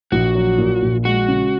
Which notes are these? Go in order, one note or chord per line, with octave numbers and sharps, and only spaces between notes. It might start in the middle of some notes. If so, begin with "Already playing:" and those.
A#1 F#4
F#3
A#2
A#1
G#3 F#4
C#3